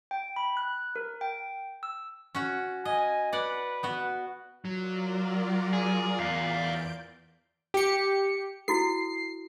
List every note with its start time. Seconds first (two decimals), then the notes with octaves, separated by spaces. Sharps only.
0.11 G5
0.36 B5
0.57 F#6
0.96 A#4
1.21 G5
1.83 E6
2.35 C#4 F#4
2.85 D#5 G#5
3.33 B4 D5 F#5
3.83 B3 F#4
4.65 F#3 F4 A#4 D5
5.73 G#4
6.20 E2 D5 F5 G6 D7
7.74 G4 C#7
8.68 E4 F#4 A4 C7